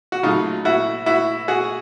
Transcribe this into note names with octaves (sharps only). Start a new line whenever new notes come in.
F#4
C#3 F#3 A3 D#4 F4
E4 F#4
E4 F#4
F#4 G#4